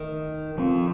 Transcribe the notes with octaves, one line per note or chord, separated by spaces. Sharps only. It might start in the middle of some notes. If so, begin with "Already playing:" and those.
Already playing: D#3
F3 C4